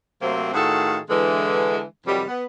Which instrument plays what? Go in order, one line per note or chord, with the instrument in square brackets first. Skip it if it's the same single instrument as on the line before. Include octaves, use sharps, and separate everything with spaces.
[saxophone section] C3 F#3 A3 A#3 C4
A2 D#3 F4 F#4 G#4 A4
D3 E3 G#3
F2 C3 D#3 F#3 G3
B3